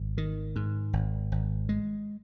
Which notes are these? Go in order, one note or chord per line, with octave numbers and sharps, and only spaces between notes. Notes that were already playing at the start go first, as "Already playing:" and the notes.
Already playing: G#1
D#3
G#2
G#1
G#1
G#3